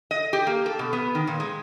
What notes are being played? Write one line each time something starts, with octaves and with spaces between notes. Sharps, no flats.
D#5
G4
A#3
A4
B2
B3
D#3
A#2
G#3